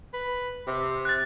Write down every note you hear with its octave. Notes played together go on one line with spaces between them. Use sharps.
B4
C3
F#6 A6